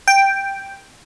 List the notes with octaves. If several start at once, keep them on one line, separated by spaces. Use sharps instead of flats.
G5